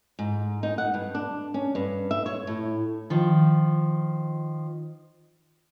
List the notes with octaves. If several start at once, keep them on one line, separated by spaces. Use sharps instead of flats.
G#2
D#4
F#5
G2
D4
C#4
G2
E5
C#5
A2
D#3 F3